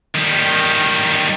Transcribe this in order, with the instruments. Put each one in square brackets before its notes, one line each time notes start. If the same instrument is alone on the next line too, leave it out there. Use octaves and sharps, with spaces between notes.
[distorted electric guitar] D#3 G3